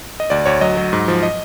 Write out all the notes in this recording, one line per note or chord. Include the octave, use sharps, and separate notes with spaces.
D#5
D2 D5
D2 C#5
F#3 D#5
F#3
G#2
F3
D#5